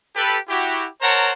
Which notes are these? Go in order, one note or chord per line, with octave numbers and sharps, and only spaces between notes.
G4 A4 B4
E4 F#4 G4
A#4 C5 C#5 F#5 A5 A#5